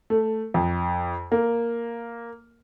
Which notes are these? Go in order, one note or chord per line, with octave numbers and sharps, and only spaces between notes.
A3
F2
A#3